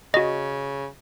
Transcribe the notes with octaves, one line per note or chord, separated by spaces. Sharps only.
C#3 F#4 D#5